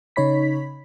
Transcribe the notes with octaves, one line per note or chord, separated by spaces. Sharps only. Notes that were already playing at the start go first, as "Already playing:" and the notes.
C#3 D#4 C#5 B5 B6